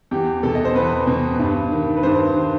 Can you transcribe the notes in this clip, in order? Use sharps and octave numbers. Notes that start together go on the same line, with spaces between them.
E2 G4
B2 A4
D#5
C5
E2 B4
B2
G2
D#3
B4
G2 C5
D#3